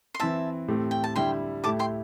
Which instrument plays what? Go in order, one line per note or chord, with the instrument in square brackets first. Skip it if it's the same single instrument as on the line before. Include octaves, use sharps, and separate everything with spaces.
[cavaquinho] C6
[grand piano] E3 C4 E4 [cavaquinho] E5 A5
[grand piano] A2 A3 C4 G4
[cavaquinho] G5
A5
[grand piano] D3 G3 E4 [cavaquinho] G5 C6
[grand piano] A2 A3 E4 G4 [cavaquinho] A5 D6
[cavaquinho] G5 C6